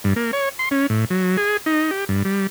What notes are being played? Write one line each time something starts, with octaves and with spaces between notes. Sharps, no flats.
G2
A#3
C#5
C6
C#4
A2
F#3
G#4
D#4
G4
G2
G3